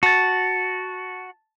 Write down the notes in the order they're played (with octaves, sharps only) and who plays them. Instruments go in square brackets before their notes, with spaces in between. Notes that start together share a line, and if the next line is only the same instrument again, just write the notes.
[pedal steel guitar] F#4 [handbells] A5 A6